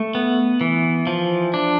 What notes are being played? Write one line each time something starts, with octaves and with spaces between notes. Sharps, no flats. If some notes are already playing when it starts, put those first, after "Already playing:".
Already playing: A3
B3
E3
F3
D4